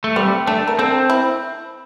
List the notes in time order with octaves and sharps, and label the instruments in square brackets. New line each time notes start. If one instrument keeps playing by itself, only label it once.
[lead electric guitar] A3
[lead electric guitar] G3 [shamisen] C4
[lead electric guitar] A3 [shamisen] D4
[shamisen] A#4
[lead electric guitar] C4 [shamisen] A4
[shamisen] E4